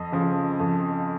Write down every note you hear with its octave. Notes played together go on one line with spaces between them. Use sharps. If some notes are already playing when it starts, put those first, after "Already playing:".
Already playing: F2 D#5
C#3 F3
F2